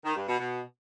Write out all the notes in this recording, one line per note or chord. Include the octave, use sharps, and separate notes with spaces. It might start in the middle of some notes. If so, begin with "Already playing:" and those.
D#3
G2
B2
B2